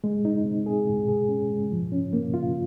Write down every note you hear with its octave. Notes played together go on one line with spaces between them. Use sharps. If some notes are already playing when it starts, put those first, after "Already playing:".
G#3
D#4
C4
G#4
G#3
G#4
C#4
G#3
F3
C#4
A#3
F4